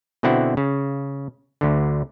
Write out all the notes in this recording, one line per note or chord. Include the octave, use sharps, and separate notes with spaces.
B2 D3 C4 E4 F#5
C#3
D2 D3